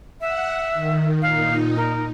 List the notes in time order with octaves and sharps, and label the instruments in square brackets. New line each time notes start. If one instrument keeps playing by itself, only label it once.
[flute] E5 [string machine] F#5
[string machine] D#3
[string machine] A#2 D#4 [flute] F5
[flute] A#4